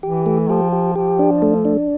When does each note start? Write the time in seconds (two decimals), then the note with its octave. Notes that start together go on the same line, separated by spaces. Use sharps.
0.03 E3 G4
0.26 A3
0.50 F3 G4
0.72 G4
0.96 F3 G4
1.19 D4
1.42 A3
1.65 D4